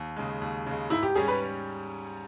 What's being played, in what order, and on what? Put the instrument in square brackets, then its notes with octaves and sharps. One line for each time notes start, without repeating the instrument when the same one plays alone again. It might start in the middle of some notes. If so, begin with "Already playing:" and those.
Already playing: [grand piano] D#2
C#3 G#3
D#2
C#3 G#3
[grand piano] G#2 [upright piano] E4
[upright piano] G4
[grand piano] G3 C#4 [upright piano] G#4
[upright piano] B4